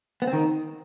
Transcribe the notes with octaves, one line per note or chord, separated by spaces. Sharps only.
B3
C4
D#3